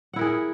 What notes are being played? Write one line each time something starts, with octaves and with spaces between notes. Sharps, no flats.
E4 G#4 A#4 F#5